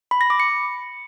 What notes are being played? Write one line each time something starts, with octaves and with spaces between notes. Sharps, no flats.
B5
A#6
D6
C#7